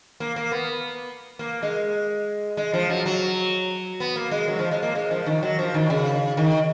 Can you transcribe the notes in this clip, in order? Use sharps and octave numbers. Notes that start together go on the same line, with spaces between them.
A#3
A#3
B3
A#3
G#3
G#3
F3
F#3
F#3
B3
A#3
G#3
F#3
F3
G#3
A#3
G#3
F3
D#3
F#3
F3
D#3
C#3
D#3